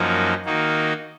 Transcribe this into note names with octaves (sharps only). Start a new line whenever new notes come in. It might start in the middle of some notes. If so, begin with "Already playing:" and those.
Already playing: F#2 F3 A#3 D#4 F#4
D#3 A#3 D#4 F#4